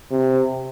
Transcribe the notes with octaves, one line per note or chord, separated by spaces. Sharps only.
C3